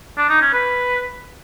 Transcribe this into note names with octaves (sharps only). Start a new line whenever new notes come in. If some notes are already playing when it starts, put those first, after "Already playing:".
D4
D#4
C#4
B4